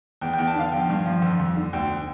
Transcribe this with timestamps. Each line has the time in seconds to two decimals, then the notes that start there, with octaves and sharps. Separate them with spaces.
0.21 E2 G5
0.33 E2 G5
0.47 A5
0.55 D3 F5
0.72 F3 G5
0.89 G2
1.06 F3
1.22 F2
1.39 F2
1.57 D3
1.73 D2 G5